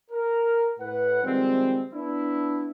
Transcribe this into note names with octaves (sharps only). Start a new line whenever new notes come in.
A#4
A2 B4 F#5
D#3 F3 G3 G#3 C4
B3 D4 E4